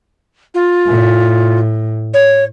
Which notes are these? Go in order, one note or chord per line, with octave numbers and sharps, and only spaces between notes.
F4
A2
C#5